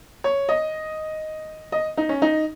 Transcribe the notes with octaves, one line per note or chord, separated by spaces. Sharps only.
C#5
D#5
D#5
D#4
C#4
D#4